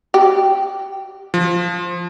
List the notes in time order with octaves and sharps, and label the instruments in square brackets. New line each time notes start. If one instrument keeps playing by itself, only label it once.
[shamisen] G4
[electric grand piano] F3